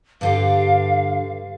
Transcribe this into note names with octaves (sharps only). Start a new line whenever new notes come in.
G2 D3 G4 F5